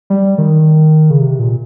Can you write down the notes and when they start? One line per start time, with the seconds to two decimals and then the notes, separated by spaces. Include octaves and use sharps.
0.10 G3
0.38 D#3
1.10 C#3
1.20 C3
1.39 A#2